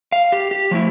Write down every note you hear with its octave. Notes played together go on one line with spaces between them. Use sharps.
F5
G4
G4
F3 A3 E4